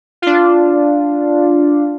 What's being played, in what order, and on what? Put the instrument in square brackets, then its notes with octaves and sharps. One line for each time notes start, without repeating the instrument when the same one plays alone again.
[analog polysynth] D4 F4